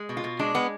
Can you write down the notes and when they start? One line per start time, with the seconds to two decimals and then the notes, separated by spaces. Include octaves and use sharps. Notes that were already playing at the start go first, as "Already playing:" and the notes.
Already playing: G#3
0.09 B2
0.17 F4
0.24 B2
0.39 G#3 D4
0.55 G#3 B3